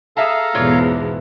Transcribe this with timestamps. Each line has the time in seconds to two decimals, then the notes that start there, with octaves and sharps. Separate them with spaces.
0.17 G#4 A4 E5 F5 A5 A#5
0.55 E2 G#2 B2 F4 C#5 D5